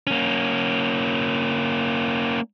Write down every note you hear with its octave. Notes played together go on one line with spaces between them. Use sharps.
A#3 C#4